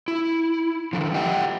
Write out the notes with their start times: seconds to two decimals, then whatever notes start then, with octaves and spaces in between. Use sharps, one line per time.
0.08 E4
0.93 D3 D#3 F3
1.14 G4 D#5 F#5 G5